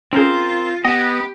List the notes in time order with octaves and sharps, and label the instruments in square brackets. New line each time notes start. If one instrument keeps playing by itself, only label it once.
[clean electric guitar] C4 A#4 C5 [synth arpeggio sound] C#4 G#4 [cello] F4
[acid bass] B3 [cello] G4 [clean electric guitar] D#5 [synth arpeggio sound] F#5 E7